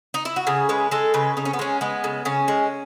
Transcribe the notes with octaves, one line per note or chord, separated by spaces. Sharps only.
D#4
E4
F#4
C#3 G#4
G#3 B4
G#3 A4
C#3 B4
C#3 D#4
C#4
B3
G#3 C#4
G#3 B3
C#3
C#3 C#4
G#3